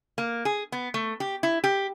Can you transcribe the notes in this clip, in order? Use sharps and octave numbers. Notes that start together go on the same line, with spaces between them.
A#3
G#4
B3
A3
G4
E4
G4